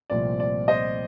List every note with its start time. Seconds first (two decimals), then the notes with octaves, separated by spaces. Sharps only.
0.10 C2 A#2 F3 A3 C4 D5
0.40 D5
0.68 C5 D#5